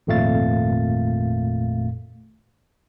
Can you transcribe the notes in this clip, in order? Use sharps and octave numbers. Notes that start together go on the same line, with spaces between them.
G#1 F2 A#2 A3 F5 A6